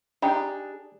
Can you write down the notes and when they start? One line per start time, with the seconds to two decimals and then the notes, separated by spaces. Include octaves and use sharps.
0.22 D4 D#4 G4 G#4